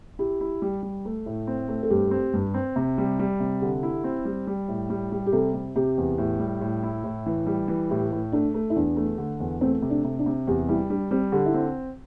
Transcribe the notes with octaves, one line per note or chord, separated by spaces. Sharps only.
E4 G4
E4
G3
G3
A3
A2
C4
A3
A4
G2 G4
C4
G2
C4
C3
G3
G3
C3
D3 G4
E4
C4
G3
G3
A2
G3
G3
G4
C3 A4
C3
C3 G4
E2
A2
G3
A2
E4
A2
E3
G3
E3
A2 G4
A2
A3 D4
A3
E4
E2 D4
A3
D3
E2
A3 C4
C3
D4
C3
D4
C3
E2 G4
G3 E4
G3 D4
G3 C4
D3 G4
E4
C4